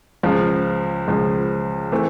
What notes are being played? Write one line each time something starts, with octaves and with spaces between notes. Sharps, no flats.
C#2 C#3 F3
C#2 C#3 F3
E3 A3 C4